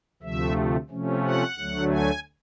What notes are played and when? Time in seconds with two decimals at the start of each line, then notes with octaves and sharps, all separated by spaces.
0.23 D2 C3 F3 A3 E5
0.90 C3 F3 A3 C#4
1.24 F#5
1.57 D2 D3 F#3 A3
1.90 G#5